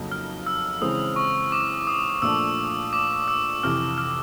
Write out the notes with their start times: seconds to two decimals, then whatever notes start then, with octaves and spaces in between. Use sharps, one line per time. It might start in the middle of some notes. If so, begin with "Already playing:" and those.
Already playing: F2 C#3 F#3 A#3 D#4
0.12 F6
0.46 E6
0.82 C#3 E3 G#3 C4 D#6
1.16 C#6
1.52 D6
1.87 D#6
2.22 A#2 F3 A3 D4 F4 E6
2.93 D6
3.28 E6
3.63 F2 C3 E3 F6
3.98 F6